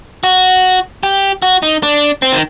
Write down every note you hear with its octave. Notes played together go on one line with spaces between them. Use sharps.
F#4
G4
F#4
D#4
D4
C4
D#3